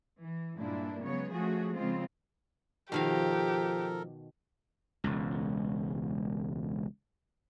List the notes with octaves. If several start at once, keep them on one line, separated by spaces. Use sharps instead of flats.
E3
G2 A#2 G#3 D4 E4
C#3 F#3 G#3 B3 C#5
F3 A3 C#4 F#4 G#4
C#3 F3 G#3 C4 F4
B2 D#3 F3 G4 A4 A#4 F5
E1 C#2